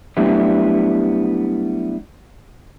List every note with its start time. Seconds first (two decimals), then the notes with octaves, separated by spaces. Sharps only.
0.17 F#3 G3 A3 B3 D4 E4